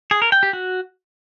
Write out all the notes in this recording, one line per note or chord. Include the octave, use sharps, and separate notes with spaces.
G#4
A#4
G5
G4
F#4